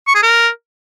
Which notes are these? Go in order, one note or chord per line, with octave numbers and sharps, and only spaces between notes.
C#6
G#4
A#4